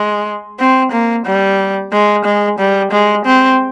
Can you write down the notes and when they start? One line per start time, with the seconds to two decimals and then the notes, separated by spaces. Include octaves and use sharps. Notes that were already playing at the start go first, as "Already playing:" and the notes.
Already playing: G#3
0.59 C4
0.92 A#3
1.26 G3
1.93 G#3
2.25 G#3
2.59 G3
2.91 G#3
3.26 C4